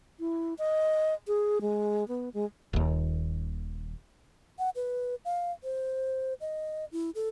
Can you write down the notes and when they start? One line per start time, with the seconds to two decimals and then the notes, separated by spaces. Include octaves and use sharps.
0.20 E4
0.59 D#5
1.27 G#4
1.61 G#3
2.08 B3
2.34 G#3
2.73 D#1 D#2
4.59 F#5
4.75 B4
5.25 F5
5.63 C5
6.41 D#5
6.92 E4
7.15 A4